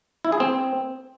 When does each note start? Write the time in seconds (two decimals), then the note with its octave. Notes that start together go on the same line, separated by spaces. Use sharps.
0.25 E4
0.32 G#4
0.40 C4